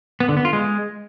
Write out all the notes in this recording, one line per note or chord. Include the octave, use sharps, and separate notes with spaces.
B3
D3
B3
F4
G#3